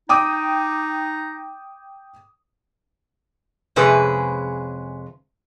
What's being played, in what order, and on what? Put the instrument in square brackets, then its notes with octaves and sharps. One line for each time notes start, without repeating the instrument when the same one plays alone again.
[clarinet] D#4 [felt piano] G5 D6 D#6
[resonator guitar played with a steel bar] F2 C3 G#3 C#4 G#4 B4